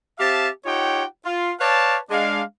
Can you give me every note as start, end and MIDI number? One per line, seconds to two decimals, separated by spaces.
0.19 0.49 60
0.19 0.49 67
0.19 0.49 76
0.19 0.49 77
0.19 0.49 81
0.66 1.05 63
0.66 1.05 65
0.66 1.05 67
0.66 1.05 73
0.66 1.05 78
0.66 1.05 79
1.25 1.53 65
1.60 1.98 71
1.60 1.98 73
1.60 1.98 74
1.60 1.98 77
1.60 1.98 81
2.10 2.42 56
2.10 2.42 62
2.10 2.42 77